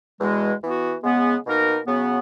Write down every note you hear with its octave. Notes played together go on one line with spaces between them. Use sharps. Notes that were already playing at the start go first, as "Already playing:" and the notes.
E2 B2 G#3
E3 B3 F#4
C#3 G#3 B3
B2 A#3 D#4 A#4
C#3 F#3 B3